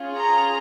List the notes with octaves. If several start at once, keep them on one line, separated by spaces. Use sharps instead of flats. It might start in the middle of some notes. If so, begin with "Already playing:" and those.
Already playing: C#4 F4 G#4
A#5